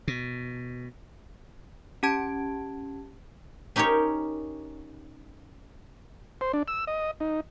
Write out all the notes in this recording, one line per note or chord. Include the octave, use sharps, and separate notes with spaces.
B2
C#4 G4 A5 G#6 D7
C#4 D#4 G4 A#4 C#5
C5
D4
E6
D#5
D#4